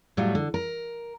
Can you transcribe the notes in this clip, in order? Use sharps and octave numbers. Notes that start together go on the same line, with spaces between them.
A2 F#3 G3 F4
D3
A#4